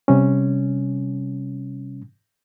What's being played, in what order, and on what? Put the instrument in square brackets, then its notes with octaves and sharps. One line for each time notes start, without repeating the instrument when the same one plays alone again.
[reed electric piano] C3 G3 C#4